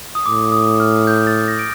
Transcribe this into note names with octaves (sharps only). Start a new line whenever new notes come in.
D#6
A2 D6
D#6
F6
G6
A6
A#6
D7